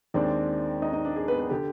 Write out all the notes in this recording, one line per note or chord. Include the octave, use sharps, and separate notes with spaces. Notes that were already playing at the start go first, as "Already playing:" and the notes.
D#2 D#3 G#3 C4 D4 D5
D#4 D#5
D#4 D#5
D4 D5
G#4
B3 B4
B3 B4
D3 G4